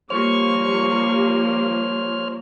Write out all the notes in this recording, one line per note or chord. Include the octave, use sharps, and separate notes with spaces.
F3 G3 A#3 C5 C#5 C#6 F6